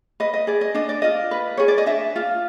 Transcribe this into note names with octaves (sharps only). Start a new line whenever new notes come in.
B4 D#5
D#5
G#4 D5
D#5
D4 D#5
D5
F4 D#5
B4
G#4 C#5
D5
D#5
D4 E5
F4